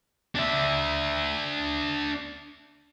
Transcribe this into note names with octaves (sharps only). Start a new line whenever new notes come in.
D4 E5